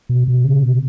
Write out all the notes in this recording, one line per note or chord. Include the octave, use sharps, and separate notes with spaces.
B2
B2
C#3
B2